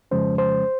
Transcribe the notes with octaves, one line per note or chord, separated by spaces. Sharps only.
F2 C#3 F3 G#3 C#4 C5
C5